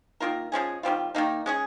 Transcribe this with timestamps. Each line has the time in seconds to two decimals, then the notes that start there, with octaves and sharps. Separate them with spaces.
0.20 D#3 A#3 F4 A#4
0.52 F3 G#3 C#4 G#4
0.83 D#3 G3 C4 F4
1.15 D#3 A#3 D#4
1.46 G#3 C#4 G#4